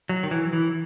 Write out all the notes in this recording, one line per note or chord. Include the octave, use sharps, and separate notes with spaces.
F#3
D#3
E3
E3